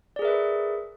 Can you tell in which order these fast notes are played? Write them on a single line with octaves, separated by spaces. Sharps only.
D5 G#4 A#4 E5 B4